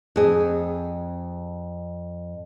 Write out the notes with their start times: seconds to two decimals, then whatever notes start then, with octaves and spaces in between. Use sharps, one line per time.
0.16 F2 G#4